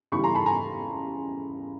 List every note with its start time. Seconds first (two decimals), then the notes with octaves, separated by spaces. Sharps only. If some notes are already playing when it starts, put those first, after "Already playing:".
0.12 C#3 E3 G3 B5 C#6
0.24 A#5 C6
0.34 A5 B5
0.46 G#5 A#5